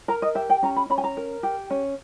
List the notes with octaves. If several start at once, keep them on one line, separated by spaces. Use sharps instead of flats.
A#4 A#5
D#5
G4 E5
G5
C#4 A#5
B5
C#4 B5
G#5
A#5
A#4
G4
C#4